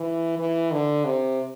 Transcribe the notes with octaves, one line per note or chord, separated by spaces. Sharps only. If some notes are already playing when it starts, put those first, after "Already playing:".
Already playing: E3
E3
D3
C3